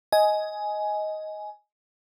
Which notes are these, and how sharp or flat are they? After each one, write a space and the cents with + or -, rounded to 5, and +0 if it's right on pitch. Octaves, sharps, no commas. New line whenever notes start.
D#5 +10 G#5 +10